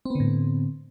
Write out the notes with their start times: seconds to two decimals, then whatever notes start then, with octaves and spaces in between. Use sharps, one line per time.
0.05 C4
0.10 B3
0.15 D3
0.20 A2